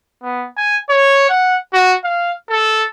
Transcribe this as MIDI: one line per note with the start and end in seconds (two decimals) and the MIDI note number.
0.23 0.46 59
0.57 0.78 80
0.89 1.27 73
1.29 1.56 78
1.73 1.94 66
2.04 2.32 77
2.49 2.83 69